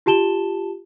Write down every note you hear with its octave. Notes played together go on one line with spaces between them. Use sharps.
F4 G4 A5 E7 G7